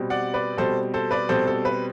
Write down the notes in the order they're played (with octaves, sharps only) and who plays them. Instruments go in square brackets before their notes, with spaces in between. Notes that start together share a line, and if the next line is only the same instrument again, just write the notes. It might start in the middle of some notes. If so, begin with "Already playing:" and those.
Already playing: [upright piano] B2 G3 C4
D5 F#5
B4 D5
B2 G3 C4 A4 C5
A4 C5
B4 D5
B2 G3 C4 A4 C5
A4
B4